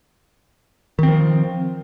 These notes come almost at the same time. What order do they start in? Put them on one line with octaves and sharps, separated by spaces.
D#3 C4 F3